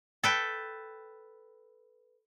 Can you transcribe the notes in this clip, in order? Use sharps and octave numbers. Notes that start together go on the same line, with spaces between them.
A4 B4 G5